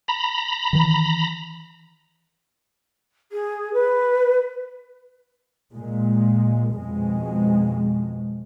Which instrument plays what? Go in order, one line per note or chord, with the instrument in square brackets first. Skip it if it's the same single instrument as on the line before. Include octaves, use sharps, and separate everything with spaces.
[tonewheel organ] A#5 B5
[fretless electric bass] D#3 E3
[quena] G#4
B4
[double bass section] A#2 G#3
F2 B2 G#3